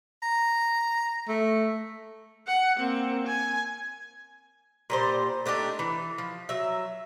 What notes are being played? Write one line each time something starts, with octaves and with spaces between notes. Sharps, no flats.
A#5
A3
F#5
A#3 C4
G#5
A#2 G3 C5
A3 D4 D#4 G4
E3
F3
F#3 E5